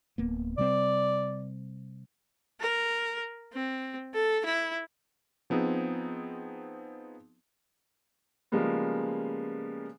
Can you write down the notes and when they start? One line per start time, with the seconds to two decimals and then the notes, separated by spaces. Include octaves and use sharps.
0.18 D1 A#3 B3
0.58 C3 G3 C4 D5
2.61 A#4
3.53 C4
4.14 A4
4.45 E4
5.50 F3 B3 C4 D#4 G#4
8.52 C#3 F3 G3 G#3 A#3 B3